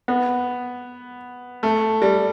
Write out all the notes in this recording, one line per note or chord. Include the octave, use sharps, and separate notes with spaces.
B3
A3
G3